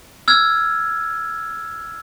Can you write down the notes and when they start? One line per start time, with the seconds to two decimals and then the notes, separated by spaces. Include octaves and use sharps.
0.28 E6 F6 G#6